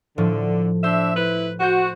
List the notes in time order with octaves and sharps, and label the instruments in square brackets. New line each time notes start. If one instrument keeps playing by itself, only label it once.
[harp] A2 F3 [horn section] D3
[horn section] D4 E5 [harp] C5
[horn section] E4 B4
[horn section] F#4 [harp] C5 F#5 G6